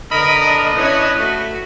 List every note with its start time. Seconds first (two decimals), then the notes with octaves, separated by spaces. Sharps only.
0.11 D3 A#4 B4 D#5 B5
0.41 D4
0.76 C#4 E4 B4 C#5
1.19 A3 F#4